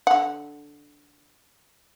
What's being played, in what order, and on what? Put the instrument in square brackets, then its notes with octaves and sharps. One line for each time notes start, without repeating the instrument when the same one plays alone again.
[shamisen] D3 F#5